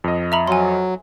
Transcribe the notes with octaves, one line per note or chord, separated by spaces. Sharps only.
F2 D#5
E5 A#5 B5
F#3 G#5 C6